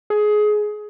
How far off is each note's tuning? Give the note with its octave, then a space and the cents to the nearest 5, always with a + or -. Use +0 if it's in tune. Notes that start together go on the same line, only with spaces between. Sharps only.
G#4 +20